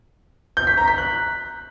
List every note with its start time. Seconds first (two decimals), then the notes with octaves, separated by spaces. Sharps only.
0.57 G6
0.67 B6
0.77 A#5
0.88 B6
0.98 F#6